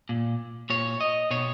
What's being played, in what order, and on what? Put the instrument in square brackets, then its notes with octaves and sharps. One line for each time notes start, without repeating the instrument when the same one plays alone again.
[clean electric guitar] A#2
A#2 C#5
D#5
B2 C#5